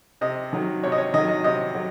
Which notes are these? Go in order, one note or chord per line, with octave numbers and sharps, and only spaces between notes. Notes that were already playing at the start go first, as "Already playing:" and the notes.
C3 D#5
D#3 F#3
C3 C#5
D#5
C#5
D#3 F#3 D#5
D#5
C3 D#5
F#3